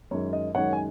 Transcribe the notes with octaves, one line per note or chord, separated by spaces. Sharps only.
F#2 D#3 G#3 C#5
D#5
F#2 D#3 G#3 C#5 F#5
G#5